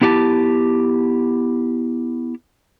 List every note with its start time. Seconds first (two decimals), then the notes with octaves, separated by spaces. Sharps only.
0.02 B3 E4 G4 F#5 A5